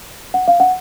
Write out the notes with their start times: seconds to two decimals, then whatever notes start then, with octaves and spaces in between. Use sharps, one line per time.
0.34 F#5
0.48 F5
0.60 F#5